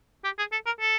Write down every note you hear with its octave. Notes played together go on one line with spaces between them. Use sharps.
G4
G#4
A4
A#4
A4